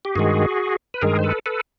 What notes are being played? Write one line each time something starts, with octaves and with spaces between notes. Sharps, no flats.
G4
G2 D#3 G#3 F#4 G#4
B4
G2 D#3 G#3 G#4 A#4
C5
A4 B4
A4 B4